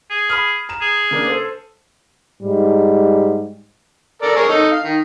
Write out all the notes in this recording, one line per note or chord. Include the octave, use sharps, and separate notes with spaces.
G#4
B5 D#6 F6
A#5 E7
G#4
C#3 A#3 D4
A4 C5
G#2 G3
A4 A#4 D5
G#4 A#4 C#5
D#4 A4
F5
D#3